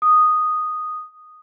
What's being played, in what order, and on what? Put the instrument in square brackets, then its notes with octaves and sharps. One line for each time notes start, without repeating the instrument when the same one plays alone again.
[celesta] D#6